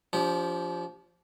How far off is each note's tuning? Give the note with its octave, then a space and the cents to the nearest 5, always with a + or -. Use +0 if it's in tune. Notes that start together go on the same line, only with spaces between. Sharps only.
F3 +0 D4 -40 G4 +0